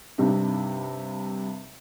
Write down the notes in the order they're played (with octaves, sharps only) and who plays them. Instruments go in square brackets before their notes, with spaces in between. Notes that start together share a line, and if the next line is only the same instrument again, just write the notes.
[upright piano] G2 C3 D4 D#4